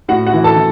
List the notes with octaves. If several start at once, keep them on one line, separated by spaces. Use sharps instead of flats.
A2 F#4 F#5
F#4 F#5
E3
A4 A5
E3